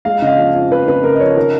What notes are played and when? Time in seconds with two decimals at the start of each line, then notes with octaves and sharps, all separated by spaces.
0.05 G#3 F5
0.22 C#3 D#5
0.27 F5
0.38 F3
0.55 F2
0.71 F2 B4
0.88 C#3 B4
1.04 C#3 A#4
1.14 D#5
1.20 F3 C#5
1.37 D#3 A#4